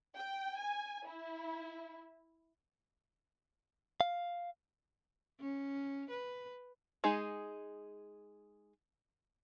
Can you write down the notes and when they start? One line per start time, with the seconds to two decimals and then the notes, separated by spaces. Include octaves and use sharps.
0.16 G5
0.59 G#5
1.06 E4
4.01 F5
5.40 C#4
6.10 B4
7.04 G#3 D#4 G#4